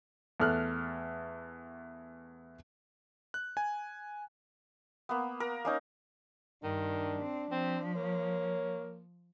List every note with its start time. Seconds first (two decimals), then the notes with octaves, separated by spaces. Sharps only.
0.40 E2 A3 F6 F#6
3.34 F#6
3.57 G#5
5.09 A#3 B3
5.40 A#4
5.65 A#3 C#4 D#4
6.63 G2 D#3 D4
7.22 C4
7.51 F3 C4
7.95 A#3 C#5